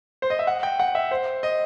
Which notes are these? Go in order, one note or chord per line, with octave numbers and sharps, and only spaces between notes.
C5
D#5
E5
F#5
G5
F#5
E5
C5
D#5